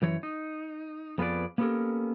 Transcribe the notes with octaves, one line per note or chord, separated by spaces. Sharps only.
F#2 E3 C#5
D#4
F2 B3 F4 G#4 B4 D5
A#3 B3 C#4 G4 A4 A#4